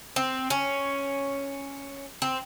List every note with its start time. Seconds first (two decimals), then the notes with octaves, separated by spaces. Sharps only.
0.16 C4
0.50 C#4
2.22 C4